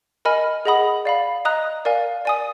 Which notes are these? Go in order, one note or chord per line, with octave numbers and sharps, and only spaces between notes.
A#4 D#5 G#5 B5 F6
G#4 D#5 F#5 B5 D#6
D5 F5 B5
D#5 A#5 D#6 F#6
A#4 D5 F5 G#5
D5 G#5 D#6